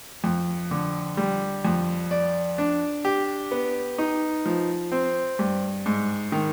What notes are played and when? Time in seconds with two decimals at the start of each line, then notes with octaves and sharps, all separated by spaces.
0.24 F2
0.71 D3
1.17 G3
1.65 F2
2.11 D5
2.58 D4
3.05 G4
3.51 B3
3.98 D#4
4.46 F3
4.92 C4
5.39 G2
5.86 G#2
6.32 D#3